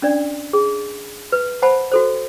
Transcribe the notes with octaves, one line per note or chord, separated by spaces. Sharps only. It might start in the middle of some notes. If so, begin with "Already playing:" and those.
C#4 D4 D5
G#4
B4
C5 F#5 G#5 A5 B5
F#4 A4 C5